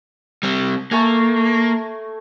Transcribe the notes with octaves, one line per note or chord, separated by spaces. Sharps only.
G3 C4
A3 A#3 A4 G#5